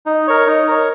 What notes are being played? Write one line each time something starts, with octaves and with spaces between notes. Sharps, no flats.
D#4
A#4 C#5
D#4
A#4 C#5